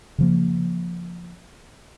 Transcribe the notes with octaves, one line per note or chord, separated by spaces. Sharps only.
C#3 F3 A#3